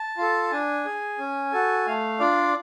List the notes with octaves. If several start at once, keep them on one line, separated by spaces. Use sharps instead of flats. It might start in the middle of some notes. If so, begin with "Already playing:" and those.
Already playing: A5
F4 A4
D4 G#5
G#4
C#4
F#4 A4
A3 F5
D4 F4 D5